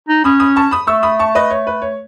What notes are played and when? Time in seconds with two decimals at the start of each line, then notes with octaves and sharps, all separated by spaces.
0.09 D#4
0.24 C#4 B5 D#6
0.40 B5 D#6
0.56 A5 C#6
0.71 B5 D#6
0.87 A3 C#6 E6
1.03 B5 D#6
1.19 A5 C#6
1.35 B4 D#5
1.50 C#5
1.67 B4
1.82 C#5